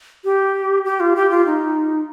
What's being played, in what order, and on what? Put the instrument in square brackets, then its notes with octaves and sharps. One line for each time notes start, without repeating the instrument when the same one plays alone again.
[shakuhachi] G4
G4
F4
G4
F4
D#4